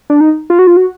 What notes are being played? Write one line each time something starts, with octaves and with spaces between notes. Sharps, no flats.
D4
D#4
F4
F#4
F4
F#4